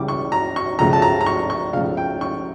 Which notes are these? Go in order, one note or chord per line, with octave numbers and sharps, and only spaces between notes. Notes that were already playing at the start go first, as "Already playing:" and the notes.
Already playing: C#2 C#3 E3 G3 C#4 D6
C#6
A#5
C#6
C#2 C#3 F3 A3 A#5
A5
A#5
A#5
C#6
C#6
C#2 C#3 F3 A3 F5
G5
C#6